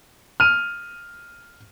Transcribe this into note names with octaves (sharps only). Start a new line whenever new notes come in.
F6 D#7